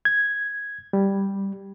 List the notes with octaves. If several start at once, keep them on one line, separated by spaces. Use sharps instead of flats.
G#6
G3